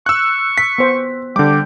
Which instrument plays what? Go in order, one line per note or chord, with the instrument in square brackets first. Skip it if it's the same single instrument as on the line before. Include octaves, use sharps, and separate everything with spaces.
[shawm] C#6 [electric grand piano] E6 F#6
[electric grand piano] B6
[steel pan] B3 C5
[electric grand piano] D3 D6 [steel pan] G3 [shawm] G5